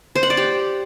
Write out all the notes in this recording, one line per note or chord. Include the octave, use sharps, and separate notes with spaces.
C5
F#5
D5
G4